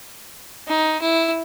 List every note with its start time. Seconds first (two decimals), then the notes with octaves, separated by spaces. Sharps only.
0.68 D#4
1.01 E4